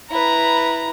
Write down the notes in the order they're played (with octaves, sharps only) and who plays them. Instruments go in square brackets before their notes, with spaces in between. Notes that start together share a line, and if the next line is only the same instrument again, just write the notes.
[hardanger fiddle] E4 B4 [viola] A#5